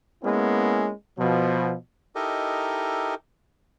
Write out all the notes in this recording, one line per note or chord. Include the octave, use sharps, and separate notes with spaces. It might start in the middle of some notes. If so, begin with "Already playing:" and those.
G#3 A#3 B3 C#4 E4
B2 F3
D#4 E4 G4 A4 A#4 D#5